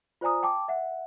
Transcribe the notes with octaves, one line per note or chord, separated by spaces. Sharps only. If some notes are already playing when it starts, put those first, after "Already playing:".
F4 C5 D5 G#5 A#5 D#6
G5 A5 D6
E5 F#5